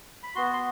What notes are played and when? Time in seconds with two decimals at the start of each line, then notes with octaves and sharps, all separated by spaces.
0.23 B5
0.35 B3 F#4 C6
0.53 C6